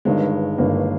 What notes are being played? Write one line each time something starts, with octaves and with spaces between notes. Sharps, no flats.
G1 G2 D#3 G#3
G1 G2 D#3 A#3